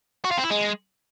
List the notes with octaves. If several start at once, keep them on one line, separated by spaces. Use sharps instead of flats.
F#4
F4
C4
E4
G#3